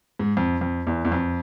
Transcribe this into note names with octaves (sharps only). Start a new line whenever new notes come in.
G#2
F2
F2
E2
E2
F2